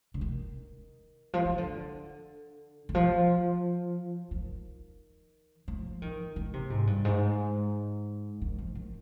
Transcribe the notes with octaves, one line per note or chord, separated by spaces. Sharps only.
D3
D#3
F3
D#3
D3
D#3
F3
D#3
F3
D#3
D#3
C3
G#2
G2
G#2
D#3
F3
D#3